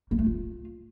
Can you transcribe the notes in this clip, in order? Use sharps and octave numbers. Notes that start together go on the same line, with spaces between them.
A#3
A3
F4